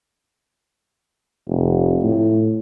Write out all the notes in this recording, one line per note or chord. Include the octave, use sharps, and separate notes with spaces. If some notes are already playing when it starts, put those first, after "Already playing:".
F1
A2